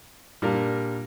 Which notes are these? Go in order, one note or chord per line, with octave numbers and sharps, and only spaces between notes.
A#2 G3 D4 A#4